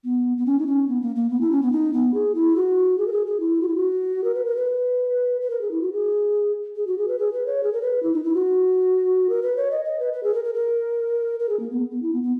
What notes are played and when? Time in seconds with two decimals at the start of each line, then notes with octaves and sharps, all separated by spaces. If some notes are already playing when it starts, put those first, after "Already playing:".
0.04 B3
0.37 B3
0.46 C#4
0.59 D#4
0.67 C#4
0.88 B3
1.02 A#3
1.16 A#3
1.30 B3
1.41 E4
1.51 C#4
1.62 B3
1.72 D#4
1.93 B3
2.14 G#4
2.35 E4
2.56 F#4
2.98 G#4
3.07 A#4
3.12 G#4
3.27 G#4
3.40 E4
3.62 F#4
3.68 E4
3.76 F#4
4.24 A#4
4.35 B4
4.45 A#4
4.56 B4
5.41 B4
5.50 A#4
5.61 G#4
5.71 E4
5.82 F#4
5.92 G#4
6.76 G#4
6.87 F#4
6.98 G#4
7.08 B4
7.19 G#4
7.33 B4
7.46 C#5
7.64 G#4
7.73 A#4
7.82 B4
8.03 E4
8.13 D#4
8.24 E4
8.34 F#4
9.29 A#4
9.43 B4
9.57 C#5
9.71 D#5
9.85 D#5
9.99 B4
10.13 B4
10.23 G#4
10.34 A#4
10.44 A#4
10.54 A#4
11.40 A#4
11.49 G#4
11.60 A#3
11.70 B3
11.91 B3
12.02 E4
12.13 B3
12.23 B3